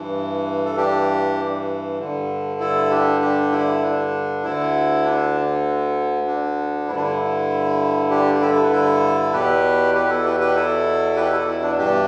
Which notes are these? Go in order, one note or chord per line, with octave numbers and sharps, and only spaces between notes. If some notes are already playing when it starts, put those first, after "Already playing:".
Already playing: G2 E3
A4
D4 G4
G2 D3
E4 A4
D4 G4
D4 G4
E4
D4
D2 D3 E4
D4
D4
G2 D3 D4 E4
E4
D4 G4
G4
E4 A4
B4
E4 A4
E2 B2 G4 B4
G4 B4
E4 A4
G4 B4
G4 B4
E4 A4
G4 B4
E4 A4
E4
D4
G2 E3 D4 G4